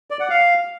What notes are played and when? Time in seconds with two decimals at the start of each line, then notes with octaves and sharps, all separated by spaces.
0.11 D5
0.20 F#5
0.30 F5